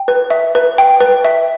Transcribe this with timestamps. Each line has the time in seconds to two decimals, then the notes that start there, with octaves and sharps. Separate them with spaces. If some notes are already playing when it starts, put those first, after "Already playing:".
Already playing: G5
0.08 B4
0.30 E5
0.55 B4
0.78 G5
1.00 B4
1.25 E5